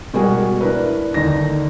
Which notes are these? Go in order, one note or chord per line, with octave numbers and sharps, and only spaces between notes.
B2 G3 G#3 F#4 G#4 A#4
D4 E4 A#4 B4
D#2 D3 D#4 A#6